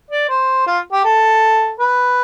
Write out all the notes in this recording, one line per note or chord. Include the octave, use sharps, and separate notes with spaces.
D5
C5
F4
G4
A4
B4